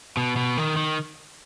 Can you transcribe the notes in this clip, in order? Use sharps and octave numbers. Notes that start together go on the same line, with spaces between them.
B2
B2
D#3
D#3